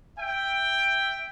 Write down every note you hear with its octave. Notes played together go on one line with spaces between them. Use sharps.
E5 G5